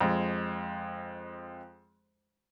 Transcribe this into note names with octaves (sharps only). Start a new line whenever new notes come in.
F2 G#3